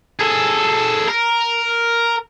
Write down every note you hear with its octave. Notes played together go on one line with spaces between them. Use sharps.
G#4 A4
A#4